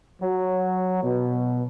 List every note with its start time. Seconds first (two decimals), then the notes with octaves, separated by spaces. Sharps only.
0.22 F#3
1.03 B2